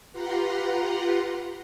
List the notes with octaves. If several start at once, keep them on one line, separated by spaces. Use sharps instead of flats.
F4 G4 B4 F#5 A#5 C6